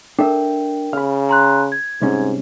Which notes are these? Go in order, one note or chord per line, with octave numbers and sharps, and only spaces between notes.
D4 A4 A#4 E5 G5
C#3 F5 B5
A#5 C6 F#6
G#6
C2 G#2 C3 C#4